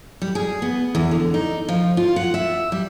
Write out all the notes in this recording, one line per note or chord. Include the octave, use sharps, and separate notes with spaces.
G3
G#4
B3
E2
D3
D#4
F3
F4
F#5
E5
G3